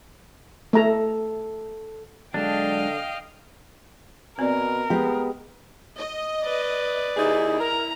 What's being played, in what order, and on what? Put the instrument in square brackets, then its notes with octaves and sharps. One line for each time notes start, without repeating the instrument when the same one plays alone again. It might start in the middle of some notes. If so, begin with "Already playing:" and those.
[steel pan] A3 A#5 [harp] A4 E5
[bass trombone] D3 [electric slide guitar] F#3 G#3 A5 [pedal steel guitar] D4 [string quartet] D#5 F5 G5
[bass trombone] B2 [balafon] C4 D5 [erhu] A#4
[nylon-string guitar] G#3 G4 [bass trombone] B3
[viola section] D#5
[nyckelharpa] B4 D5
[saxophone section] D#2 D#4 G#4 [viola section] E4
[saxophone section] A#4 [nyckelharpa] A#5